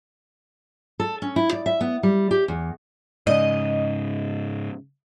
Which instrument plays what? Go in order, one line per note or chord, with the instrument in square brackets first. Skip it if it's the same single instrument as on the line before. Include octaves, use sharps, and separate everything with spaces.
[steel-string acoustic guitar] A4
C#4
E4
D5
E5
B3
G3
G4
E2
[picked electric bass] G#2 C#3 [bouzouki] D#5